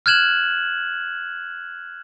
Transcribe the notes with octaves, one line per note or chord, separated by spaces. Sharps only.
F6 F#6 G#6 E7 F#7